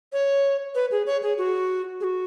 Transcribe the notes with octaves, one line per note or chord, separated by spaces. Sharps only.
C#5
B4
G#4
C#5
G#4
F#4
G#4
F#4